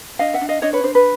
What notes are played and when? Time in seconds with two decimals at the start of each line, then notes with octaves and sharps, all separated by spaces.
0.19 D4 D#5 F5
0.34 E5 F#5
0.41 D4
0.49 D#5 F5
0.62 D4 C#5 D#5
0.73 B4 C#5
0.84 D4 C5
0.95 B4